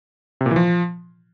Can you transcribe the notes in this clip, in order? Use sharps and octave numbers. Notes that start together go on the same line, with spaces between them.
C3
A#2
E3
F3